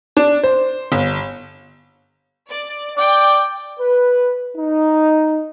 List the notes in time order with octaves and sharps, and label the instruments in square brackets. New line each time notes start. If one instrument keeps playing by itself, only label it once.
[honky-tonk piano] D4
C5
G1
[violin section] D5
[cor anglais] D5 [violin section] G5
[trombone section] B4
D#4